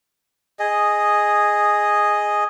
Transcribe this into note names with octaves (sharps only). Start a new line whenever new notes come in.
G#4 D#5